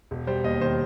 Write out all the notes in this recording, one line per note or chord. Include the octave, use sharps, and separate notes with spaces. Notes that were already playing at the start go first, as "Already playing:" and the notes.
E1
G3 C5
D#2 D#5
D#3 C5